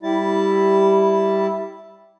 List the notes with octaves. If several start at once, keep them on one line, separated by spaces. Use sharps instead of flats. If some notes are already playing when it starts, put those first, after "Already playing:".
G3 E4 A5